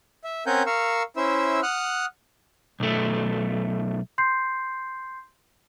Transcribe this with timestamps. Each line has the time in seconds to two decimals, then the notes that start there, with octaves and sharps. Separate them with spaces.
0.24 E5
0.46 C4 C#4 A#4 F#5 G#5 G6
0.66 A#4 F5 C#6 E6
1.17 C#4 E4 C5 E5 E6
1.63 F#5 D#6 F6 F#6
2.80 B1 A3
4.18 C6 G6 C7